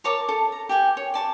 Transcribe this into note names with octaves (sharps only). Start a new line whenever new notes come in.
A#4 C#5 A5 D6
A4
A#5
G4 G5 G#5
C#5
D5 A5 C#6